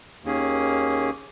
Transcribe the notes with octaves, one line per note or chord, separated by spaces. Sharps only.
D#2 D#3 A#3 C#4 G#4